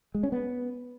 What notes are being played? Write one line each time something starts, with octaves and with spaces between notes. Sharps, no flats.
G#3
C#4
B3